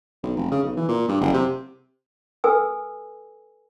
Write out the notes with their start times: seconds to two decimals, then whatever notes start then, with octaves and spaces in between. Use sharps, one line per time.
0.24 B1
0.37 F1
0.52 C#3
0.63 B1
0.77 E3
0.88 A#2
1.08 G2
1.21 F#1
1.34 C3
2.44 A4 B4 G#5 E6